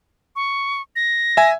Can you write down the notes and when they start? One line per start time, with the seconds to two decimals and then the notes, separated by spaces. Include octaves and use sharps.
0.36 C#6
0.96 A#6
1.37 E5 G#5